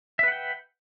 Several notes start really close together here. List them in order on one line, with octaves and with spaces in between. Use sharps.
E5 B4 F#5 G5